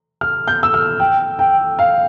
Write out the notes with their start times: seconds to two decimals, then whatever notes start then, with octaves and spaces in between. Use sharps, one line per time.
0.21 F6
0.48 G6
0.63 E6
0.74 F6
1.00 G5
1.39 G5
1.79 F5